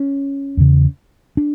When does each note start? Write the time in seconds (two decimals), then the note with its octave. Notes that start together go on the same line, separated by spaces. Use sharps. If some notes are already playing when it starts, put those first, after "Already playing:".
Already playing: C#4
0.57 E2 C#3
1.37 D4